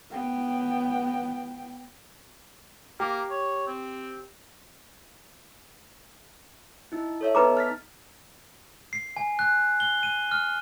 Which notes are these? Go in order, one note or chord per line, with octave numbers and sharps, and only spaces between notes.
B3 G5
A#3 G4
C#5
C4
D#4 E4
A4 C#5 E5
B3 D#4 G#4 B4 A#5 D6
F6 A6 B6
C7
G#5
F#6
G7
D#7
F6